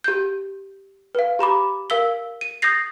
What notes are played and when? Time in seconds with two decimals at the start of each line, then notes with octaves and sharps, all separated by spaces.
0.04 G4 G6
1.15 B4 F5
1.39 G4 A#5 B5 D6
1.90 A#4 F5 E6 B6 G7
2.41 D#7
2.62 D#6 G6 A6 A#6 C7